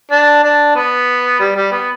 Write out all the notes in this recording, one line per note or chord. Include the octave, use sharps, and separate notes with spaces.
D4
D4
B3
G3
G3
B3